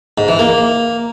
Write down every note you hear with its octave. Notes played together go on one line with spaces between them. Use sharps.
G#2
E3
A#3